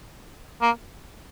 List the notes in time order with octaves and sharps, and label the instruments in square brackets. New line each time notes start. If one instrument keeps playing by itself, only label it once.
[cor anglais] A#3